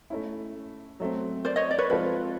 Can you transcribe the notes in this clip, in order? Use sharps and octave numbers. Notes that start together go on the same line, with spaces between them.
A3 C#4 E4
F#3 A3 C4
C5 D5
C#5 D#5
D5
B4 C#5
F3 G#3 C4 F4 A4 B4